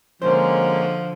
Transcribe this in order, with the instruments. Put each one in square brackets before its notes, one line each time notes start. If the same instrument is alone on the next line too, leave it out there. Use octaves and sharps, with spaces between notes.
[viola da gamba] D3 [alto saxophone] F3 [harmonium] G#3 A#3 C#4 [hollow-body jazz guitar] C5